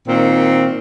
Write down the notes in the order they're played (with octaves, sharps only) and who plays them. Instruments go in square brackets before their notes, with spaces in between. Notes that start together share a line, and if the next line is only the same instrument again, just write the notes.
[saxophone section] A#2 D#3 C4